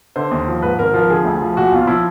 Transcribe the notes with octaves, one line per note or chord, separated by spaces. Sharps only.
D3 C5
D#2
F3
G#2 B4
G#1 A#4
F3 A#4
D3 G#4
D2
F3
A#2 F#4
B1 F4
F3 E4